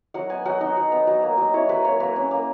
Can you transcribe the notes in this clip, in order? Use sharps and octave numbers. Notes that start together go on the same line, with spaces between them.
F#3 F#5
B3 G#5
F#3 F#5
D#4 D#5
F#3
B3
F#3
A#3
F#3
E4 C#5
F#3 B4
A#3 C#5
A#3 B4
C#4
A#3